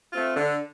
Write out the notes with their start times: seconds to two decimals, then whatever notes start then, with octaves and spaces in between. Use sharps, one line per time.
0.12 A3 C4 F4
0.36 D3